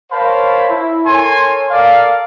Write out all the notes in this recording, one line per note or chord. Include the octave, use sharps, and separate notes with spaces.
A#4 C5 C#5 F5 A5 B5
E4
A4 A#4 C#5 G#5 C6
A4 A#4 D5 F5